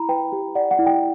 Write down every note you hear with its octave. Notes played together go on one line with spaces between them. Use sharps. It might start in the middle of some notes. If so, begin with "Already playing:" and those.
Already playing: E4 A#5 B5
B4 G5
G4
D5 F#5
F#5
E4
G5